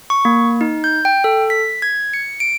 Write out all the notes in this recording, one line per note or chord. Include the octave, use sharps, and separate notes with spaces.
C#6
A#3
D#4
G6
G5
A4
B6
G#6
C#7
D7